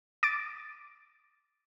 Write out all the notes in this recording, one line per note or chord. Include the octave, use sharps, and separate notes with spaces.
D6 A6 D7